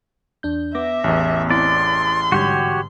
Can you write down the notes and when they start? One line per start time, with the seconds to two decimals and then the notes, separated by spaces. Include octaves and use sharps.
0.43 E2 D4 G6
0.75 B3 E5 D6 A#6
1.04 A1 E2
1.50 C4 E4 D5 C6
2.32 G#2 D3 G3 F#4 G4 C#5